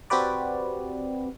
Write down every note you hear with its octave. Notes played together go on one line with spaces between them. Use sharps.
C4 F#4 G4 B4 D5